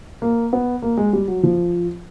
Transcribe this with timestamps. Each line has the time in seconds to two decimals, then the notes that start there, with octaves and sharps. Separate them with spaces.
0.22 A#3
0.53 B3
0.82 A#3
0.97 G#3
1.13 G3
1.28 F#3
1.43 F3